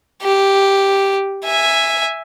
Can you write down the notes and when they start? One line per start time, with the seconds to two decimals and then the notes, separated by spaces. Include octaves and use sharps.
0.23 G4
1.44 E5 G#5